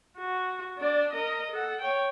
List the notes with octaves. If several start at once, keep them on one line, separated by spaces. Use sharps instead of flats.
F#4
D4 D5
A#4 D#5
A4 F#5
C#5 G5